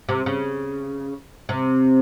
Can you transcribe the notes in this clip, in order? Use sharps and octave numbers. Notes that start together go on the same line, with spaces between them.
C3
C#3
C3